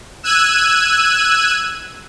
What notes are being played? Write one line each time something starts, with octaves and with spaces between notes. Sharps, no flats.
E6 F#6 G#6 D#7